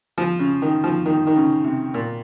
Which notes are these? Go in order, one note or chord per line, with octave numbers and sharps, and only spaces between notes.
F3
C#3
D#3
F3
D#3
D#3
C#3
C3
A#2